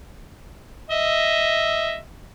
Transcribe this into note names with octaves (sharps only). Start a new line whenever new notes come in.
D#5 E5